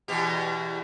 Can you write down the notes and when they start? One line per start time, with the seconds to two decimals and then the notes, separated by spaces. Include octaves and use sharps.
0.08 E2 B2 G4